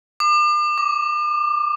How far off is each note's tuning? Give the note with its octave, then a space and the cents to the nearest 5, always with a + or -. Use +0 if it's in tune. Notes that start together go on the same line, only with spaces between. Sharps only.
D6 +40
D6 -5